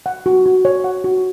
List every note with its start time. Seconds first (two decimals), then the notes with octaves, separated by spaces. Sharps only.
0.06 F#5
0.26 F#4
0.46 F#4
0.65 C#5
0.84 F#5
1.04 F#4